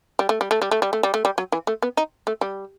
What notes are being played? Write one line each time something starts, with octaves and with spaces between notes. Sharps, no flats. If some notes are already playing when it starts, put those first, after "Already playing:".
G3
A3
G3
A3
G3
A3
G3
A3
G3
A3
G3
F#3
E3
A3
B3
D#4
A3
G3